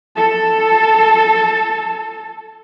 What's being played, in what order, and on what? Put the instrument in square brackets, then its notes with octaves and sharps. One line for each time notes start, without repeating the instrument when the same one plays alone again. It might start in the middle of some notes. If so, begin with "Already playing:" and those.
[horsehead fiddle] A4 A5